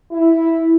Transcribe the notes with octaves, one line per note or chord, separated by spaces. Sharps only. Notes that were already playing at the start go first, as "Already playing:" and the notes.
E4